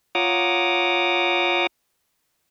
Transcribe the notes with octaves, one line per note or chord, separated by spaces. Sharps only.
F4 C#5 F#5 A#5 D6 D#6